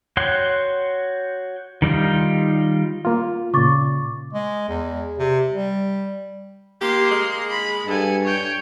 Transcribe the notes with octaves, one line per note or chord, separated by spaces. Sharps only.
F#4 C#5 F#5 G5 C6
D#3 G3 D#4 F4
A#3 F4
A#2 C#3 C#6 D6 A6
G#3
E2
C3
G3
A#3 G4 C6
G#3
B5
G2 A4 G#5
C#5 G5